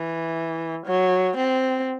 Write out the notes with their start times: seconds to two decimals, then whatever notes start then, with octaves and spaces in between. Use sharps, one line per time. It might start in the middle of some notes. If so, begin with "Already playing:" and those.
Already playing: E3
0.86 F#3
1.37 C4